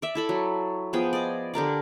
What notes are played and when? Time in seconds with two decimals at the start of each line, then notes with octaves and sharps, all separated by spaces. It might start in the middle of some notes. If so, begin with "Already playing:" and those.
0.02 D5 E5
0.15 E4 A4 B5
0.29 F#3
0.93 F3 B3 G#4 G5
1.13 D5 D#5
1.54 D3 G4 A#4 D5